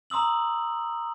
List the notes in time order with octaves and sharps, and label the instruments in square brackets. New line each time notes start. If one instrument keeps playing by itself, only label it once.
[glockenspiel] A#5 C6 D#6 E6 F#7